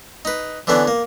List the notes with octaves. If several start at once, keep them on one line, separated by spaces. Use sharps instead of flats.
D#4 B4
D3 E3 B3 C#4 D4
A#3